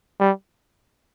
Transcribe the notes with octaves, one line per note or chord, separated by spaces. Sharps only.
G3